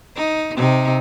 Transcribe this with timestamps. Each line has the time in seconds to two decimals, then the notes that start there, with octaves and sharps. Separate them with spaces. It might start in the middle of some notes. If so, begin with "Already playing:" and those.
0.16 D#4
0.56 C3 D#4